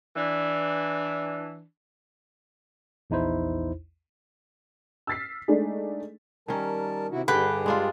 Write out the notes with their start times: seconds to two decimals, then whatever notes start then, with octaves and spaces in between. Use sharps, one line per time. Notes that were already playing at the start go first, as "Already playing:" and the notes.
0.16 E3 D4
3.10 A#1 E2 D#4 E4 C5
5.07 E6 F6 A6 B6 C7
5.48 G#3 A3 D4 D#4 G#4
6.48 D#3 G3 C#4 A#4 A5
7.11 C3 E4 F#4
7.28 G2 D3 G4 G#4 B4 G5
7.66 G#3 D4 F4